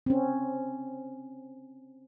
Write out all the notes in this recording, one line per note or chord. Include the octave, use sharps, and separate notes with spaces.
C4 C#4